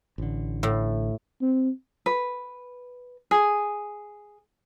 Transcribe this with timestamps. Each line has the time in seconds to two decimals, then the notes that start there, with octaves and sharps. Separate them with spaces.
0.18 A1 D3
0.63 A2
1.41 C4
2.06 B4
3.31 G#4